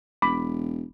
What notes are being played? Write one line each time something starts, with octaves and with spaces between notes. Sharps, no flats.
E1 B5 D6